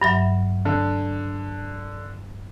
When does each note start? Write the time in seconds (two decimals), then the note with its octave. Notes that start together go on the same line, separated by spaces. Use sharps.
0.01 G2 F#3 E5
0.65 D3